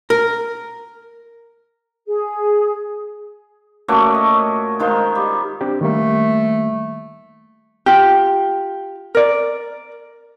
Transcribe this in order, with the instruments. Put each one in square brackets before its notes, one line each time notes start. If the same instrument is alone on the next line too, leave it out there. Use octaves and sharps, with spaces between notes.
[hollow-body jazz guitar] A#4
[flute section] G#4
[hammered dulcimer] A#2 A3 C#4 F#4
D#5
D#3 G#3 F4 C5
G3
[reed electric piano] C4 D4 G4
[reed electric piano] D#3 G3 A#3 [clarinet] A3
[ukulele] F4 G4
A#4 D5